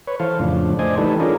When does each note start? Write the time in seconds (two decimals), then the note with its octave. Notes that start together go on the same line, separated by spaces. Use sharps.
0.08 B4 C#5
0.20 E3 A4 C5 F5
0.40 F2 A2 C#3 D4
0.79 A3 C5 D5 D#5 G#5
0.98 E3 G3 A3 D#4 A4 B4
1.20 C#4 D4 F4 G#4 A#4